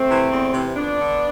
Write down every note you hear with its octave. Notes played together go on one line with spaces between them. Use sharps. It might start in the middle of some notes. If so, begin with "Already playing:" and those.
Already playing: A3 C4
C3 E3
E2
C3 E3
F2 B3 D4
D3